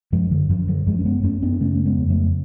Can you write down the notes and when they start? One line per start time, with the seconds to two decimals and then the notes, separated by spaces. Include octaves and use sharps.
0.12 F#2 F3 G#3
0.31 D3 F#3
0.50 F#2 F3
0.68 D3 F#3
0.87 F#2 F3 G#3
0.99 C#4
1.05 G#3 B3
1.24 F#2 A3 C#4
1.42 B3 D4
1.53 D4
1.61 C#3 A3 C#4
1.75 A3
1.85 G#3 B3
1.98 F2
2.10 F#3 A3